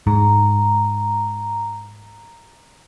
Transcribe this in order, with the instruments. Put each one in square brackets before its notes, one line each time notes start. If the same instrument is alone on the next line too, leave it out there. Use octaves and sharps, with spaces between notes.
[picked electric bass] G#2 [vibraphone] A#5